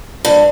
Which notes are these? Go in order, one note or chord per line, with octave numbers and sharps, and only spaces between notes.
G2